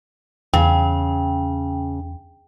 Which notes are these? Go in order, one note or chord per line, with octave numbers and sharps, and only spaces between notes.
E2 C#3 G5